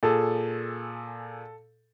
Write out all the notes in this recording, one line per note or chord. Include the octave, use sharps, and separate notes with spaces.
A#2 G#4 A4